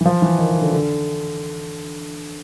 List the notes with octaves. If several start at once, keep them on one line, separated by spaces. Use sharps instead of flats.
E3
F3
E3
D#3
D#3
D3
D3